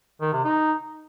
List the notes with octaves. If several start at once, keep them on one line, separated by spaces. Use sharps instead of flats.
D#3
C3
D#4